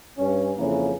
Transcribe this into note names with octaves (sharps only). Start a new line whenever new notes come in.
G2 C#4
F2 C#3 E3 A#3 C#4